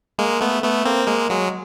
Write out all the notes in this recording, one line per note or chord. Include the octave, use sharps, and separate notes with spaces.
G#3 A#3
A3 B3
A3 B3
A#3 C4
G#3 A#3
F#3 G#3